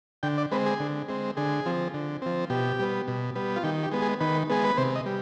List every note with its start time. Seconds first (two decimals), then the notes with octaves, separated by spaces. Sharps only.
0.23 D3 G5
0.38 D5
0.51 G#3 C4 B4
0.66 G#4
0.80 D3
1.08 G#3 C4
1.37 D3 G#4
1.66 F3 C4
1.94 D3
2.22 F3 C4
2.50 B2 G4
2.79 G3 B3
3.08 B2
3.36 G3 B3
3.56 F4
3.64 D#3 G4
3.83 G4
3.92 G#3 B3
4.02 G#4
4.21 D#3 B4
4.50 G#3 B3 G#4
4.65 B4
4.77 C3 C5
4.96 D#5
5.06 G3